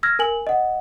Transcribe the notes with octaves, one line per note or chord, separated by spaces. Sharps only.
E6 F6 G#6 A#6
A#4 G#5 F#7
D#5 F#5